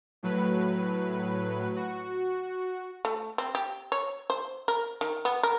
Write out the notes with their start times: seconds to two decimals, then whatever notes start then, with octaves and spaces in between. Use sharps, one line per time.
0.23 A2 F#3 B4
1.76 F#4
3.05 A3
3.38 C4
3.55 G4
3.92 C#5
4.30 C5
4.68 A#4
5.01 D#3
5.25 B3
5.43 A#4